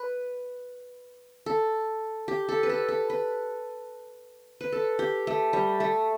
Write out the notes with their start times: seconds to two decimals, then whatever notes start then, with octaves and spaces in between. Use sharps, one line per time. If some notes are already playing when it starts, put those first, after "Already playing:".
Already playing: B4
1.46 A4
2.28 G4
2.49 A4
2.63 B4
2.69 A4
2.89 A4
3.10 B4
4.61 B4
4.72 A4
4.99 G4
5.27 A3
5.53 G3
5.80 A3